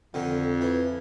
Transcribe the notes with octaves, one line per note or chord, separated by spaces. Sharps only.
F2 D3 D#3
E3